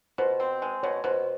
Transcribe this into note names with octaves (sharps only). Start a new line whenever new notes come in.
B2 C5
C4
G#3
B2 C#5
B2 C5